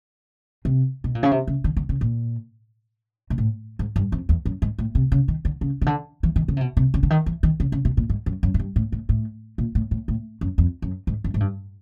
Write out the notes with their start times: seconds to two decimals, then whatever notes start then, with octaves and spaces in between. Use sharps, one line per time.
0.65 C3
1.04 B2
1.15 A#2
1.23 C#3
1.31 C3
1.48 C#3
1.64 D3
1.77 D3
1.89 C#3
2.01 A#2
3.30 A#2
3.38 A2
3.79 G#2
3.96 G2
4.12 F2
4.29 E2
4.46 F#2
4.62 G#2
4.78 A2
4.95 C3
5.12 C#3
5.28 D#3
5.45 D3
5.61 C#3
5.82 C#3
5.86 D3
6.23 E3
6.36 D#3
6.48 C#3
6.57 C3
6.61 B2
6.77 C3
6.94 C#3
7.03 D3
7.10 D#3
7.26 E3
7.43 D#3
7.60 C#3
7.72 C#3
7.85 B2
7.97 A#2
8.10 G#2
8.26 F#2
8.43 F#2
8.54 G#2
8.59 G2
8.76 A2
8.92 A2
9.09 A2
9.58 A#2
9.75 A2
9.91 A2
10.08 A2
10.41 F#2
10.58 F2
10.82 F#2
11.07 G#2
11.24 F#2
11.34 G#2
11.40 G2